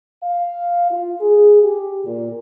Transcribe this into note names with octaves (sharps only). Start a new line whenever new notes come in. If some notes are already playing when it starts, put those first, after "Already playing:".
F5
F4
G#4
G4
A#2